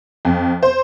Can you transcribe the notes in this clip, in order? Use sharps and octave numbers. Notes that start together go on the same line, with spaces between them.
F2
C5